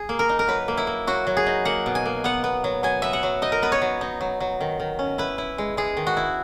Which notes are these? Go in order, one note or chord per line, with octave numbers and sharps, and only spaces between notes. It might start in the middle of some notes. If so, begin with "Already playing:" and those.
Already playing: G#4
A#3
A#4
D#4
A#4
F#3 B4
A#3
E4
A#3
F#3 F#4
F#3
G#4
D#4
A#3 F#5
B2
G#5
A#3
B3 F#5
B3
F#3
F#3 G#5
B3 E5
F#5
F#3
D#4 D#5
A#4
B3 B4
C#5
F#3
D#4
F#3
F#3
D#3
D#3
C#4
E4 B4
E4
G#3
G#3 G#4
D#3
F#4
E4